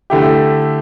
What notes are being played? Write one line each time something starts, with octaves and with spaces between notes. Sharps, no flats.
D3 A3 E4 G4